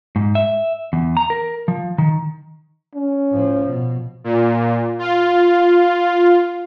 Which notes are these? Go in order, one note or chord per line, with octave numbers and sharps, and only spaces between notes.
G#2
E5
E2
A#5
A#4
F3
D#3
C#4
A2 F3
B2
A#2
F4